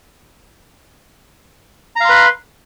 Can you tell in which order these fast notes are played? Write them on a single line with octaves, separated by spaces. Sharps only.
A#5 F5 C6 B4